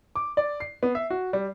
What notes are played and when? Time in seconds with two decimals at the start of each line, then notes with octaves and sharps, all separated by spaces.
0.16 D6
0.37 D5
0.60 C7
0.83 B3
0.95 E5
1.10 F#4
1.33 G3